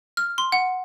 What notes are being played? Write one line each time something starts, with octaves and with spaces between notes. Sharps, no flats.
F6
C6
F#5